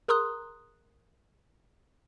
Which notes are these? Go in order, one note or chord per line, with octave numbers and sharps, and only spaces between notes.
G#4 A#4 A#5 C6 D#6 F#6